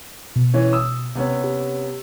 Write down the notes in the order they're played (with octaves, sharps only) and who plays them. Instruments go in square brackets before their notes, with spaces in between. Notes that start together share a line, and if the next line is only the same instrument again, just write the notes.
[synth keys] B2
[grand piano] E3 C#4
D#6 E6
C3 B3 C#4
[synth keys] G4